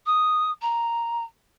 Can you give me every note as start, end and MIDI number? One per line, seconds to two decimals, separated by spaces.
0.06 0.51 87
0.62 1.24 82